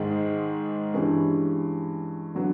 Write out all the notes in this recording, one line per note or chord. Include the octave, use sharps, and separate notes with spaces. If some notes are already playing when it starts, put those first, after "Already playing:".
Already playing: G#2 D#3 G#3
G2 E3 G#3 C#4
D3 F#3 B3